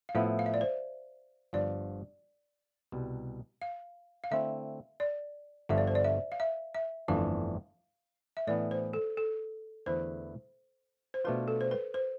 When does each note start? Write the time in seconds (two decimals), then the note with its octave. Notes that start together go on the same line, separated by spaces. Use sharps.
0.09 F5
0.15 A2 F3 B3 E4 E5
0.39 F5
0.46 E5
0.54 D5
0.61 C5
1.53 G1 G2 F3 D5
2.92 C2 B2 G3
3.61 F5
4.24 F5
4.31 D3 A3 C4 E4 E5
5.00 D5
5.69 G1 G2 D3 F3 E5
5.78 D5
5.87 C5
5.95 D5
6.04 E5
6.32 F5
6.40 E5
6.75 E5
7.08 G1 F2 E3 A3 D4 F5
8.37 E5
8.47 A2 E3 B3 D4 D5
8.71 C5
8.93 A4
9.17 A4
9.86 E2 D3 A3 E4 B4 C5
11.14 C5
11.24 B2 A3 D4 F4 B4
11.48 A4
11.61 C5
11.71 B4
11.94 C5